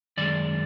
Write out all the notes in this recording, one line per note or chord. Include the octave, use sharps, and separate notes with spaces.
F#2 D#3 G#3 D5